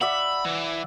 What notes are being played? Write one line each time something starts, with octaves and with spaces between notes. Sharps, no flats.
D5 E5 F#5 B5
E3